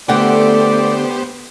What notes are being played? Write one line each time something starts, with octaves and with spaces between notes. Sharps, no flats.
D3 A3 B3 G4 C5 D5 F#5 G5